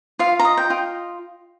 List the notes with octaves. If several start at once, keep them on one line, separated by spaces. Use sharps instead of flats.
F4 F5
A#5
D#5
G5
F4